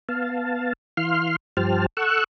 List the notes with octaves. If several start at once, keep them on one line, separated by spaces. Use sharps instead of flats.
B3 F5 A5
E3 F5 C6 F6
G2 F3 G4 C5 A5 F6
A4 F#5 C#6 E6 F#6